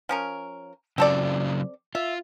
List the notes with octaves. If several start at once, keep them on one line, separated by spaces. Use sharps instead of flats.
F3 C#4 A#4
C#3 F#3 C4 F4 A4 D5
F4 E5